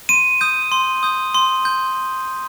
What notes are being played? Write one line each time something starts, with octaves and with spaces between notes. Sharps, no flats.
C6 D#7
D#6 G6
C6
D#6 G6
C6
G6